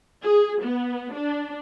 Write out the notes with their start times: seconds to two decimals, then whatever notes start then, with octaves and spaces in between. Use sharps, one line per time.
0.24 G#4
0.63 B3
1.15 D4